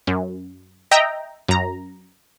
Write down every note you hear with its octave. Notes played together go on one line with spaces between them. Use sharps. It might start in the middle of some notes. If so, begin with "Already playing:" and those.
F#2
D#5 E5 G5 A#5
F#2 A#5